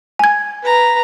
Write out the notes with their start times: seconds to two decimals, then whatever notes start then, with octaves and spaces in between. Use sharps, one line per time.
0.19 G#5 G#6
0.63 B4 A#5